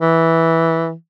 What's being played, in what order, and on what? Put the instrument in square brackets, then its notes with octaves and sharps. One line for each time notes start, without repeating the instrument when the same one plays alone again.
[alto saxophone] E3